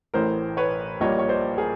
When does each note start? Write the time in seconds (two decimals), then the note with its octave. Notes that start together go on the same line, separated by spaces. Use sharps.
0.14 A1 A2 E3 A#4 C5
0.57 B4 C#5
1.00 A#1 A#2 G3 A#3 C#5 D#5
1.19 C#5
1.29 C5 D5
1.58 G#4 A#4